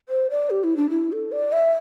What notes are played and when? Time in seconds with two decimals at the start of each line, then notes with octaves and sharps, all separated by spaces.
0.09 C5
0.30 D5
0.50 G4
0.64 E4
0.77 D4
0.90 E4
1.12 A4
1.32 D5
1.52 E5